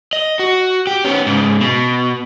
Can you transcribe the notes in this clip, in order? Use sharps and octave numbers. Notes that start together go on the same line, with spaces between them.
D#5
F#4
G4
B3 C#4
G#2 C#3
B2